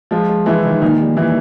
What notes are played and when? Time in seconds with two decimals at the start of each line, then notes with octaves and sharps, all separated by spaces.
0.11 F3 G#3 F4
0.29 G#3
0.46 E3 G#3 E4
0.65 D#3
0.81 A#2 D#3 D#4
1.00 G3
1.16 A#2 E3 E4